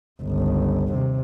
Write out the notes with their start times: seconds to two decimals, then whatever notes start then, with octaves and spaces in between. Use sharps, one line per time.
0.23 G1 C#2
0.92 D#2 C3